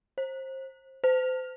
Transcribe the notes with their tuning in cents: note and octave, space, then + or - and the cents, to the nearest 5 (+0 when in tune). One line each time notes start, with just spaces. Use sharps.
C5 +25
C5 -35